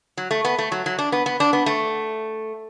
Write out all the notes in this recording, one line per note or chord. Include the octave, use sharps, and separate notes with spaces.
F#3
A3
B3
A3
F#3
F#3
D4
B3
B3
D4
B3
A3